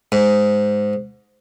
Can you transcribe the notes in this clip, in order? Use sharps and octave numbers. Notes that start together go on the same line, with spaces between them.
G#2